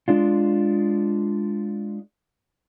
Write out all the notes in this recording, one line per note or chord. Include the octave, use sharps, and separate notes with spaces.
G#3 D4 F4